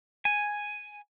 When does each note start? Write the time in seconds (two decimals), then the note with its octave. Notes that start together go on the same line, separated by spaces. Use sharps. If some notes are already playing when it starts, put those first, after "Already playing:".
0.25 G#5